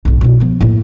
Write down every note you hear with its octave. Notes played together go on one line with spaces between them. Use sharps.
B1 G#2
B2 E4
F3 B3
A2 A#3